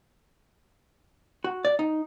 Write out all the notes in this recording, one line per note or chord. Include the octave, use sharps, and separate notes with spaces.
F#4
D5
D#4